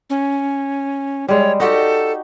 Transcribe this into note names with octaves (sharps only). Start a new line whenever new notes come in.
C#4
G3 G#3 C#5
D#4 F#4 G4 A4